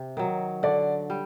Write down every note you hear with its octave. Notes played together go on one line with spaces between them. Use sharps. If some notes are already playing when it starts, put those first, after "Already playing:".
Already playing: C3
D#3 F#3
D3 D5
G3